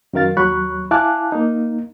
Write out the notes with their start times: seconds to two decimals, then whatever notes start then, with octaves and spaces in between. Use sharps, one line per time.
0.13 F#2 D#3 A#4 F5 A6
0.37 D#2 F#3 B5 C#6 F#6
0.91 E4 F5 G#5 A5 D6 F#6
1.32 A#3 D#4